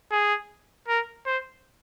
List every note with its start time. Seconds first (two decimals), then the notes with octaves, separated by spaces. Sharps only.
0.11 G#4
0.88 A#4
1.26 C5